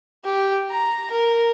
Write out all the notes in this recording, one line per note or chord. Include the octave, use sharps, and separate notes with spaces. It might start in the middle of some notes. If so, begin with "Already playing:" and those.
G4
A#5
A#4